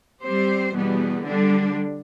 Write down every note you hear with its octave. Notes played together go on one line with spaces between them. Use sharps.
G3 C4 G4 C5
E2 B2 G3 B3
D3 G3 D4